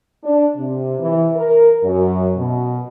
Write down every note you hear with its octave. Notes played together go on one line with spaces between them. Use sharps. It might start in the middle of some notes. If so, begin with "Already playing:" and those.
D4
C3
E3
A#4
F#2
B2